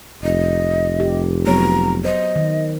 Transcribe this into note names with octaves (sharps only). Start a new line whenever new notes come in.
F1 D#5
G4
F#3 B3 C#5 A#5
C5 D#5
D#3